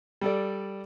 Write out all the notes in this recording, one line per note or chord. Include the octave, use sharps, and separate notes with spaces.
G3 A4 D5